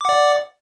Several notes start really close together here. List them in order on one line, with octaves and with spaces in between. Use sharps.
D6 F#5 D5